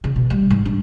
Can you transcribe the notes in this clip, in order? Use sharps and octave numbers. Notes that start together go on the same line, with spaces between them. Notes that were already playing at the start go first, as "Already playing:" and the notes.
C#3
B2
G3
G#2
D4